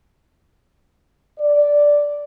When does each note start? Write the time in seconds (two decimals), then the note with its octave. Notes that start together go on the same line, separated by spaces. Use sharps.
1.39 D5